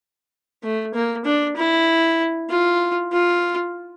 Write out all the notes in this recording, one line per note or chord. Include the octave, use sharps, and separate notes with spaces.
A3
A#3
D4
E4
F4
F4